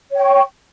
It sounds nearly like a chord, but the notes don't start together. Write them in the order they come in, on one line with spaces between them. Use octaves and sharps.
C#5 G5 C#6